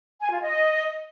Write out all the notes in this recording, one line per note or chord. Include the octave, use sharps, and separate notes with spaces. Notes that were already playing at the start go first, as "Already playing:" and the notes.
G#5
F4
D#5